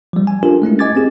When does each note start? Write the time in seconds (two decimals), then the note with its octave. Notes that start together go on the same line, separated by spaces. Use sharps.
0.13 F3 G3
0.27 G#5
0.43 D4 F4 G4 A4 A#4
0.62 G#3 A3 C#4 E4
0.79 D#5 G#5 D6 G#6 A6
0.95 C4 C#4 G4 G#4